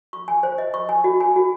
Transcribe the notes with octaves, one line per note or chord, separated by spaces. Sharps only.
C#6
G#5
C5
D#5
C#6
G#5
F#4
G#5
F#4